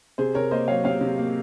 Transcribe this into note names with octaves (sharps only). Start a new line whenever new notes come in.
C3 G#4 C5
C3 A#4 C#5
A#3 C5 D#5
F#3 C#5 F5
C3 C#5 F5
C3
A#3